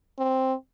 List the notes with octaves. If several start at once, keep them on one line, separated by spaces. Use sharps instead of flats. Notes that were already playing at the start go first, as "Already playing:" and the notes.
C4